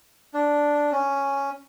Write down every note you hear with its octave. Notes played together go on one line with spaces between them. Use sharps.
D4
C#4